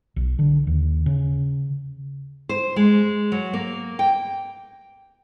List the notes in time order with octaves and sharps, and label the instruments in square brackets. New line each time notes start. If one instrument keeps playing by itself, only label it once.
[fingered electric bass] B1
D3
D#2
C#3
[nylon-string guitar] C5
G#3
F#3
A#3
G5